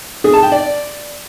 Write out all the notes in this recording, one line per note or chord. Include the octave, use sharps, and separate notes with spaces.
G#4
A5
G5
D5